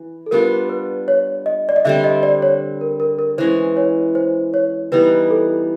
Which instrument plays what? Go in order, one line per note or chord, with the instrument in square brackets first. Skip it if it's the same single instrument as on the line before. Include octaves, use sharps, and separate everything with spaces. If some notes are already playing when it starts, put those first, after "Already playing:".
Already playing: [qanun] E3
[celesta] A4
[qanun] G3 B3 D4 F4 [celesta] A#4
[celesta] B4
C#5
D#5
D5
D#5
[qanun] D3 G3 C4 [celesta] E5
[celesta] D#5
D5
C#5
A#4
A#4
A#4
[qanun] E3 G#3 C#4 [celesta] C5
[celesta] C#5
C5
C#5
[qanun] E3 G3 B3 D#4 [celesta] B4
[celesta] A4